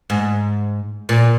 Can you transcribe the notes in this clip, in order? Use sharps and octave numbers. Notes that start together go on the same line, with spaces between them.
G#2
A#2